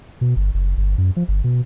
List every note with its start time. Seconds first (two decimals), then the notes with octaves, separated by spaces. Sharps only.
0.21 B2
0.36 G1
0.54 F#1
0.77 G1
0.98 F#2
1.16 F3
1.28 G1
1.44 B2